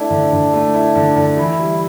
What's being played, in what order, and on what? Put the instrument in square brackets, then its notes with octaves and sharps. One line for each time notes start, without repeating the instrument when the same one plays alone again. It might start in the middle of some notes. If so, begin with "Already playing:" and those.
Already playing: [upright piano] A3 E4 [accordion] D4
[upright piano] D3
D3
A3
E4
D3
D3
[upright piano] E3 [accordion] E4
[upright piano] G3